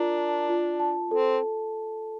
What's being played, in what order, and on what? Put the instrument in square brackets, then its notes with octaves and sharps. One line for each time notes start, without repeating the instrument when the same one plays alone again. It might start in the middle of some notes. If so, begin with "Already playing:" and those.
Already playing: [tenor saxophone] D4 [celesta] F4 A#4 A#5
[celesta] A5
F4
A5
[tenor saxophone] C4 [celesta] A4